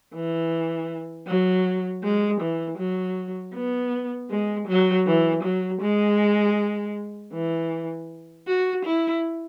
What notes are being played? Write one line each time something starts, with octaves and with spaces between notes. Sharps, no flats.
E3
F#3
G#3
E3
F#3
B3
G#3
F#3
E3
F#3
G#3
E3
F#4
E4